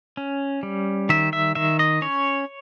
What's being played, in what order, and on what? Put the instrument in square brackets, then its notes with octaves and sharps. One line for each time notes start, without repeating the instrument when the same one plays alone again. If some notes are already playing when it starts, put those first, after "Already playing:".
[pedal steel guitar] C#4
G3
D#3 E5
E5
D#3 E5
D#5
C#4 C#5